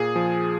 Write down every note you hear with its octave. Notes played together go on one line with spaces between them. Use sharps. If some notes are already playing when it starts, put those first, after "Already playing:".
Already playing: A#2 G#4
F3